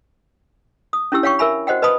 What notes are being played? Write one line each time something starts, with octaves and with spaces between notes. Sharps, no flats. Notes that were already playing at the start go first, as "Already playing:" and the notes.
D#6
C#4 D4 E4 G4 E6
C#5 F5 G5 C#6
A#4 E5 G#5 B5
F#4 C5 D#5 F#5 G5
B4 D#5 A5 B5 D#6